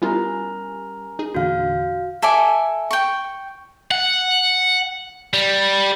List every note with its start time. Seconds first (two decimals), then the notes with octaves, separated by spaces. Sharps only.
0.02 G3 B3 C#4 E4 F4 A#4 A#5
1.19 D#4 G#4
1.35 E2 A#2 D3 F#4 F5 G6
2.22 A4 E5 G#5 D6
2.91 G5 C#6
3.91 F#5
5.34 G3